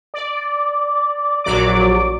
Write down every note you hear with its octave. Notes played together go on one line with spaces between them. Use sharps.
D5
A#1 F#3 D5 D6